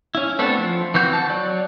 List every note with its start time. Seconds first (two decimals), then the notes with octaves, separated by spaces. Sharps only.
0.15 C#4 E4
0.39 A3 B3 C4 D4 A4
0.58 F3
0.94 E3 C4 F#4 G6
1.13 A5
1.29 F#3 D5